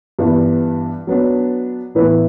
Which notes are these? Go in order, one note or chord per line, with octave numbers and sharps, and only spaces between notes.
G2 E3 B3 D4
F#3 B3 D4
A2 E3 B3 E4 B4